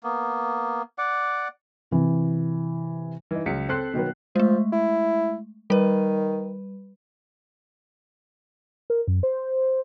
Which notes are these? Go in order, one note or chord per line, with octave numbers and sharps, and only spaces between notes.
A#3 B3
D5 F#5 D6
C3 E3
E3 D#4
C#2 F#3 B6 C#7
C4 A4 C6 F#6 C7
B2 D#3 F#3 B3
F3 G#3 A3
E4
D#3 G3 B4
A#4
F#2
C5